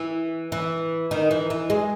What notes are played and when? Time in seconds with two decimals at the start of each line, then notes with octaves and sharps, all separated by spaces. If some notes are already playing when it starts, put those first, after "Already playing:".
Already playing: E3
0.52 E3
1.11 D#3
1.31 E3
1.50 E3
1.70 G#3